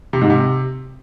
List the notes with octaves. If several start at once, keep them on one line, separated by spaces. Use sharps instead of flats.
C3
G#2
C3